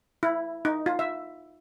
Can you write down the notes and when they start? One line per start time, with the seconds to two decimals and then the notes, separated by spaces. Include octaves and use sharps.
0.23 E4
0.65 D#4
0.86 F4
0.99 E5